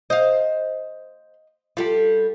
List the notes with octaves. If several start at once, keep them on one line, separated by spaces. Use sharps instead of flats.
C5 D#5 F5
G3 F4 G4 A4